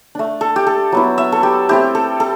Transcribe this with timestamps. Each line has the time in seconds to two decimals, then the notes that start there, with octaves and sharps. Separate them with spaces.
0.15 A3 D4
0.41 A4
0.56 G4
0.67 A4
0.92 F#3 B3 E4
1.18 E5
1.32 A4
1.43 G4
1.69 A3 C4 E4 G4
1.95 A4
2.20 A4